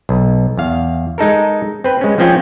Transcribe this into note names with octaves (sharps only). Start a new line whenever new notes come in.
B1
E2 F5
G#3 D#4 A4 A#4
C4 B4
G#3 C#4
F3 A#3 C4 C#4 F4